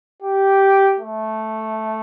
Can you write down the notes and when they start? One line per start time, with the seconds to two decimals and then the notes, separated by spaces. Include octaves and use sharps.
0.22 G4
0.99 A3